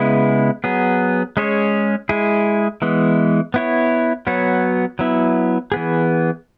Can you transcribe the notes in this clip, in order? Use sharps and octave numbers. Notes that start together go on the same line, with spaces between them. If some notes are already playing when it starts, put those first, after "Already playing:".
Already playing: C#3 G#3 B3 E4
F#3 B3 G#4
G#3 C#4 G#4 C#5
G#3 E4 G#4
E3 G#3 B3
B3 E4 C#5
F#3 B3 F#4 C#5
F#3 B3 E4
E3 B3 G#4